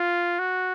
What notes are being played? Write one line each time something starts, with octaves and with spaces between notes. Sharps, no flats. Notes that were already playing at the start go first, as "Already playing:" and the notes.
Already playing: F4
F#4